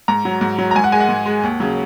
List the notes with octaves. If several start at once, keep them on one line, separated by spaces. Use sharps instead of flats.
G#2 A#5
F#3
G#2
F#3
A#5
G#2 G#5
F#5
G#3 G#5
F#5
G#2
G#3
D#2
C#3 F#3